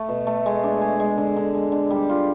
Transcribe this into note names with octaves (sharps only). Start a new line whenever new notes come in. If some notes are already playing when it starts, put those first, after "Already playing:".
Already playing: A3
B2
A3
G#3
D4
G#3
G#3
D3
D3
G#3
D3
G3
F4